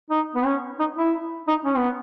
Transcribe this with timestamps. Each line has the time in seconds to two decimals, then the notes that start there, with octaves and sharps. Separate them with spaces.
0.10 D#4
0.35 B3
0.45 C#4
0.79 D#4
0.97 E4
1.48 D#4
1.65 C#4
1.77 B3